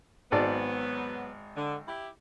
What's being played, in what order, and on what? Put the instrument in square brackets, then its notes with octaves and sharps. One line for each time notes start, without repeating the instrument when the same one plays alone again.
[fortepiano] G#1 G#2 D5 [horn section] F#3 B3
[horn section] D3
E4 G4